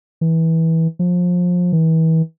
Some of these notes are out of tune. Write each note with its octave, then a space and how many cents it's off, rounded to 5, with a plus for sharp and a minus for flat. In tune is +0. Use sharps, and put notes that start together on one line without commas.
E3 -20
F3 +25
E3 -35